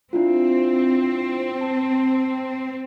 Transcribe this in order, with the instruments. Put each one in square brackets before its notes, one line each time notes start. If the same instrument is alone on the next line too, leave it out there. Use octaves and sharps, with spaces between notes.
[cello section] C4 [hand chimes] D4 E4 F4
[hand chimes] A5